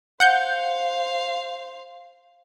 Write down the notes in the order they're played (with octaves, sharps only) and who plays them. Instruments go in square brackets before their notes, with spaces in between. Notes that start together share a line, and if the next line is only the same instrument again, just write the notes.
[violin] C5 F5 [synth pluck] F#5 G6 C#7